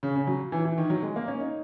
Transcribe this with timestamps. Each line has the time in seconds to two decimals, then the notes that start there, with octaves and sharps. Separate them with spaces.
0.03 C#3
0.16 C#3
0.27 F#3
0.52 E3
0.65 E3
0.78 D#3
0.90 F#3
1.03 G#3
1.16 A#3
1.28 C#4
1.40 D#4